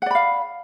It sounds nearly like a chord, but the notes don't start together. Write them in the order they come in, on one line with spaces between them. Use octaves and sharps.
F#5 D5 B5 F5